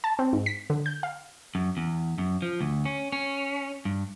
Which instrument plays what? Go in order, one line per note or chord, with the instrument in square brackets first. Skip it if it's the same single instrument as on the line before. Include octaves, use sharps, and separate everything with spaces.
[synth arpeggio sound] A5
C4
G#2
B6
D3
G6
F5
[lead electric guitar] F#2
E2
F#2
F3
D2
C#4
C#4
G2